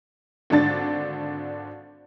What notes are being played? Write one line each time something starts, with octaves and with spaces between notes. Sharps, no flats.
G#1 D3 D4 A6